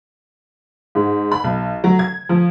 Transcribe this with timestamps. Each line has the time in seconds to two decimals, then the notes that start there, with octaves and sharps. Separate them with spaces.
0.95 G#2
1.32 B5
1.44 B1
1.84 F#3
1.99 G#6
2.29 F3